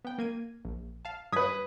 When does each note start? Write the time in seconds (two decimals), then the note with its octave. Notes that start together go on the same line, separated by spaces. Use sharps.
0.05 B3 G5
0.18 A#3 G#6 D#7
0.65 A#1
1.05 F5 A5
1.32 G2 B4 D#6 G#6 B6